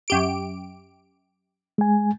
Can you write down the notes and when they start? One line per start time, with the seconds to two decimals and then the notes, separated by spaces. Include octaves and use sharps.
0.08 F#2 G4 D7
1.78 G#3 G#5